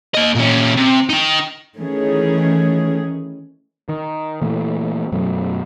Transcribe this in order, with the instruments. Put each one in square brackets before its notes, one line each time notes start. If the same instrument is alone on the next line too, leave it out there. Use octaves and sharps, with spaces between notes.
[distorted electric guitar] A#3 D#5
A#2 C#4
C3
D#4 G5
[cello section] D#3 E3 A3 C#4 G#4
[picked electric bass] D#3
A#2 E3 A3
F#2 B2 F#3 A3